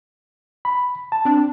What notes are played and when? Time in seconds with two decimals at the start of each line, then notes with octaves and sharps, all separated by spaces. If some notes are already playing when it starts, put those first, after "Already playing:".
0.65 B5
1.12 A5
1.25 C4 D4